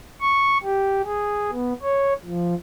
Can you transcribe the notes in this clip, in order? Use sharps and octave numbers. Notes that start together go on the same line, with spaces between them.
C#6
G4
G#4
B3
C#5
F3